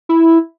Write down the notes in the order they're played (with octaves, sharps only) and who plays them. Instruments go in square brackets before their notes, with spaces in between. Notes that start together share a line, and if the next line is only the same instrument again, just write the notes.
[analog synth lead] E4